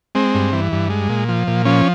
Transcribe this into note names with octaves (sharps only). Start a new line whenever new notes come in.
G#3 C4
G2
E3
G2
G#3
A#2
F3
A#2
F3 C#4